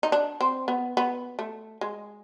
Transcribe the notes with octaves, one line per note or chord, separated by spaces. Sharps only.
D#4
D4
C4
B3
B3
A3
G#3